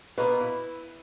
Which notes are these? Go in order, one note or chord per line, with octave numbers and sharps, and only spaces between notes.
B2 A#3 B3 B4
E4